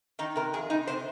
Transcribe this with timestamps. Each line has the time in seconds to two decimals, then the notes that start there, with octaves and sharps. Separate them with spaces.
0.19 D#3 D#4
0.36 C3 A#4
0.53 F2 G#4
0.70 C3 D#4
0.87 C3 C5